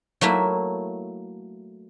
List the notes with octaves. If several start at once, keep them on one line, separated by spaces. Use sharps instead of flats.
F#3 A3 A#3 E4